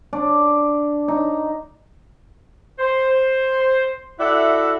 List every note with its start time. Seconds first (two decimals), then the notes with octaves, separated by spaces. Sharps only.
0.13 D4
1.08 D#4
2.79 C5
4.20 E4 F#4 A4 D5 E5 F#5